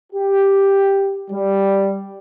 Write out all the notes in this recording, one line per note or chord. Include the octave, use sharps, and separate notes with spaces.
G4
G3